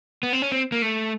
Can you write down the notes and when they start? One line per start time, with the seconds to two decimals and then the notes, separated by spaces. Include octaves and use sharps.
0.23 B3
0.33 C4
0.42 C#4
0.52 C4
0.72 A#3
0.82 A3